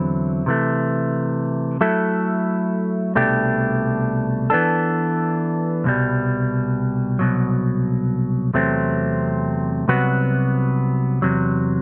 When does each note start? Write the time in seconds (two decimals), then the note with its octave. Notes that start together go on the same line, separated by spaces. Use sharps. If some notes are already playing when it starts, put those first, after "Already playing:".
Already playing: E2 D3 F#3 C4 E4
0.46 C3 E3 A3
1.81 F#3 A3 E4 A4
3.15 C2 B2 A3 D4 G4
4.50 E3 B3 D4 A4
5.84 C2 B2 G3
7.19 C2 B2 F#3
8.54 E2 C3 F#3 A3 C4
9.88 C2 C3 F#3 B3 F#4
11.22 E2 C3 F#3